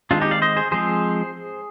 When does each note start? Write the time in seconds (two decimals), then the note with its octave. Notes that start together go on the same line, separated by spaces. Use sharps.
0.11 D#3 G#3 C4 D4 F4
0.21 D#4 G4
0.31 D5 F5
0.42 C5 D#5
0.56 G#4 C5
0.72 F3 G#3 C4 G#4 C5